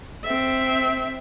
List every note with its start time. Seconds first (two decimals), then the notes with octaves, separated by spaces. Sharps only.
0.24 C4 E5